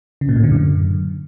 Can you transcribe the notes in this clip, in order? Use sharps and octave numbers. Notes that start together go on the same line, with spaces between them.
C#3
A#2
A2
D3
F#2